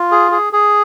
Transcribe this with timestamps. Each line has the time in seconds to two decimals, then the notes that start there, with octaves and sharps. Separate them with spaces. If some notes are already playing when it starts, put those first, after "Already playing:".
Already playing: F4
0.12 G#4
0.31 G#4
0.53 G#4